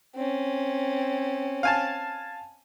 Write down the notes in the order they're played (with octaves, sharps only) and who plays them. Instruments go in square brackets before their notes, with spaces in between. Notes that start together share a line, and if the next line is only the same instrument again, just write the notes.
[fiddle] C4 C#4
[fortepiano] F5 G#5 A5